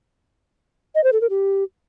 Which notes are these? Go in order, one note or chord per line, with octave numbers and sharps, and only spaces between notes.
D#5
C5
A4
A#4
G4